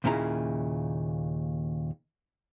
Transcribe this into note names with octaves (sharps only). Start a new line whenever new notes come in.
D#2 A#2 C#3 E4 A#5